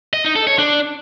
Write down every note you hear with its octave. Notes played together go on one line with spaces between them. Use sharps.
D#5
D#4
A4
C#5
D4